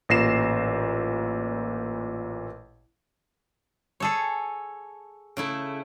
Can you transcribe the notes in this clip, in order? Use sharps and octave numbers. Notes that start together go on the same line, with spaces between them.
A1 A#2 A#6 C7 E7
G#4 A4 C#5
C#3 A3 E4